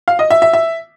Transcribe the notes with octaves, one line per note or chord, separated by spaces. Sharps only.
F5
D#5
E5
E5
E5